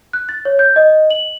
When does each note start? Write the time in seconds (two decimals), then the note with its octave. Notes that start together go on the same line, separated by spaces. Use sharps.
0.13 F#6
0.29 A6
0.45 C#5
0.59 G6
0.76 D#5
1.10 F#7